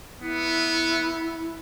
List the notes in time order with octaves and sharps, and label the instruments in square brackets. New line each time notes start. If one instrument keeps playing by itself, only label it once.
[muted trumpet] B3 [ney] E4